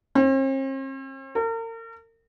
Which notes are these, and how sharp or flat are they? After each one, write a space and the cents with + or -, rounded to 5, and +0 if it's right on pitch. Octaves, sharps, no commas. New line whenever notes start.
C4 +45
A#4 -40